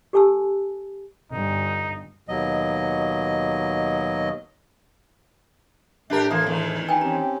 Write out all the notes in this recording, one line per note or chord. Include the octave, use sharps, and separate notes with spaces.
G4 A4 G#5 A5 E6
G1 D#4
D#2 B2 F#3 D#5
A2 A3 D4 G4 A#4 E5
E3 A#3 A4 E5 A#5
E2 D#3
D#4 B4 G5 G#5
C4 C#4 G4 A#5